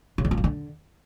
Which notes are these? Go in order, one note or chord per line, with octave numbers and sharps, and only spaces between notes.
C#3
E2
F2
F3
D3